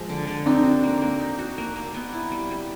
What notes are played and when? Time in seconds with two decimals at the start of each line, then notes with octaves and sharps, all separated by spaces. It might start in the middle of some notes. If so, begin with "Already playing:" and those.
Already playing: F3 G#3
0.09 D3
0.27 D3
0.46 C4 D4 D#4
0.64 F#4
0.84 A#3
1.02 A#3
1.20 D#4
1.39 F#4
1.58 A#3
1.76 A#3
1.94 B3
2.13 E4
2.31 G3
2.51 G3